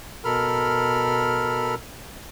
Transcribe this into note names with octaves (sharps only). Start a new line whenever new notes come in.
B2 A4 A#4 B5 F6